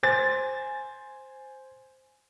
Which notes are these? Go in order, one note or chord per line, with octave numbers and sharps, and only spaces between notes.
C5 G#5 A6